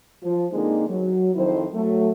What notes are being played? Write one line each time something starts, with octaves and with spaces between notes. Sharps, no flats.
F3
D3 G#3 A#3 C4 D#4
F#3
F2 D#3 E4 C5
F#3 A3